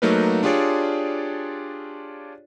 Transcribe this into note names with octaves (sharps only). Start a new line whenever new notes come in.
F#3 A3 A#3 D#4 A#4 B4
D4 F4 G4 G#4 C#5 D5